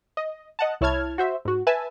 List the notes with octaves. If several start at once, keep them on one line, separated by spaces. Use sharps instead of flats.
D#5
D#5 F#5 A5
C2 E4 C#5 A5 F6 G#6
F#4 C5 E5
G#2 F#4
B4 E5 G#5 A5